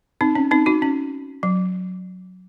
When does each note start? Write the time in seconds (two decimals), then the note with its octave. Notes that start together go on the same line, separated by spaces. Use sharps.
0.21 C4 D#4
0.35 C#4
0.51 C4 D#4
0.66 D#4 F#4
0.82 C#4
1.43 F#3